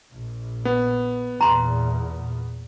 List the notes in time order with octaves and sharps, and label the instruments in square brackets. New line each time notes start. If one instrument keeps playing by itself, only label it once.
[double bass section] A#1
[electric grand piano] B3
[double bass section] E2 A#2 [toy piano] A#5 C6